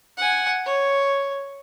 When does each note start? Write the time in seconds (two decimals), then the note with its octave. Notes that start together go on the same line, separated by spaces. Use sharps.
0.18 F#5 G#5
0.66 C#5